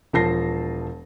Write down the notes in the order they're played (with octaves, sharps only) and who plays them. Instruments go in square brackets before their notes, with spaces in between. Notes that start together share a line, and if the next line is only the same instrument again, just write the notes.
[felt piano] E1 F3 A5 A#6 C7